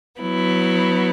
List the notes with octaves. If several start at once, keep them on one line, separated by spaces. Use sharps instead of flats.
F#3 B3 E4